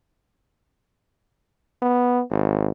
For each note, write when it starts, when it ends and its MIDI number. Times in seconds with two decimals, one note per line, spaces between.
1.82 2.21 59
2.31 2.71 32